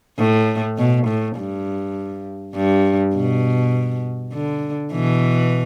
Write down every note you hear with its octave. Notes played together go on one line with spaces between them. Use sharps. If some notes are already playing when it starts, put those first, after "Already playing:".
A2
B2
A2
G2
G2
B2
D3
B2 E3